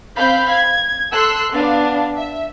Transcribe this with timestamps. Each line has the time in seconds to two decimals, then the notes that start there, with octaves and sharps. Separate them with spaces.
0.16 C4 F5 B5 G6
0.50 G#6
1.12 A4 C6 E6 F#6
1.52 B3 D4 F5
2.17 E5